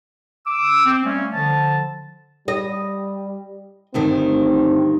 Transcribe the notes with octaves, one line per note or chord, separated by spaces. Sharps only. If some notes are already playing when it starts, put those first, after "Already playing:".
D6 E6
C4
G3 A3 A#3 C#4
D3 F3 A5
G3 D#5
D2 G2 D#3 C4